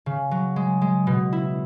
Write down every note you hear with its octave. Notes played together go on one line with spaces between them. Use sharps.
C#3
F#3
G#3
G#3
B2
E4